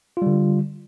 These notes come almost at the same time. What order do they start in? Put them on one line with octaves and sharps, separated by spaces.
F4 G3 D3